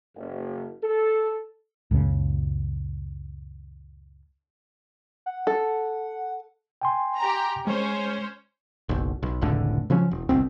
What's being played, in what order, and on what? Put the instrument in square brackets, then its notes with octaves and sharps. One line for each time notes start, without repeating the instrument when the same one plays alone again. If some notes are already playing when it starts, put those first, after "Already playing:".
[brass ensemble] F#1
A4
[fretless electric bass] C#2 F#2 A#2 C#3
[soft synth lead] F#5
[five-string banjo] A4
[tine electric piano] G5 G#5 C6
[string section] G4 A#5
[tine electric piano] G#3 [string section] C#4 C5 C#5
[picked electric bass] F#1 B1
B1
F1 C#2 A2 D3
C#3 F3 F#3 C#4
E1
G1 C2 B2 C4